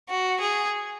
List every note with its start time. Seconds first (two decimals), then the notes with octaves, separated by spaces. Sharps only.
0.09 F#4
0.40 G#4